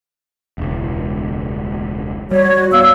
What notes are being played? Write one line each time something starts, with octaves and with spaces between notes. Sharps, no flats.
E1 C#2
G3 F#4 C#5
D1 B3 F5 E6